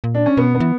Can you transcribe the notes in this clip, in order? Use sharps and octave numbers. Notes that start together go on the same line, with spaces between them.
A#2
D4
C#4
B2 B3
B3
E3